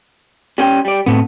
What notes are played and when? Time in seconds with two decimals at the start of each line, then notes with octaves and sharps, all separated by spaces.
0.58 G3 C#4 G5
0.85 G3 D5
1.06 A2 D#3 A3 B3 C4